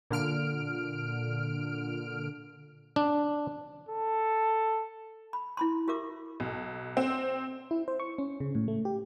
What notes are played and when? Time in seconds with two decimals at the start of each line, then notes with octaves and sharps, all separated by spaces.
0.10 A#2 D3 F6 D7
2.96 D4
3.89 A4
5.33 B5
5.57 E4 B5 C6
5.88 F#4 G4 A#4 E5 D6
6.40 B1
6.97 C4
7.71 E4
7.88 C5
8.00 C#6
8.18 C#4
8.40 C#3
8.55 A2
8.68 A3
8.85 G4